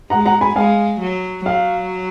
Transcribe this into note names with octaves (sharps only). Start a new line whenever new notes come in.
G#3 F#5 A#5
F#5 A#5
G#5 B5
G#3 F5 G#5
F#3
F#3 F5